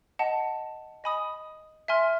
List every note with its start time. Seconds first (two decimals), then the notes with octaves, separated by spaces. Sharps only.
0.19 D#5 F#5 A5
1.04 D#5 G#5 B5 D#6
1.88 E5 G#5 C6 F6